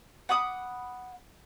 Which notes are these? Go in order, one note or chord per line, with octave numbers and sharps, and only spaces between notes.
F#5 B5 D6 D#6